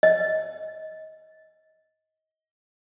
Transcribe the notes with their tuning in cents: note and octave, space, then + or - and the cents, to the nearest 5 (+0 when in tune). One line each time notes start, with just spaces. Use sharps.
D#5 +20